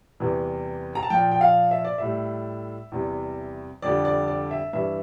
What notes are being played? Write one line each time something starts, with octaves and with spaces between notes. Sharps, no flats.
E2 C3 E3 G3
A#5
A5
A#2 F3 G5
G5
F5
E5
D5
A2 G3 E5
E2 C3 G3
F2 D3 G3 D5
D5
D5
E5
G2 E3 G3 E5